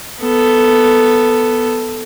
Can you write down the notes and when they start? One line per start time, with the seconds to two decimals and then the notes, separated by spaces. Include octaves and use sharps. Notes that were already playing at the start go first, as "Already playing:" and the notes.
0.21 B3 A4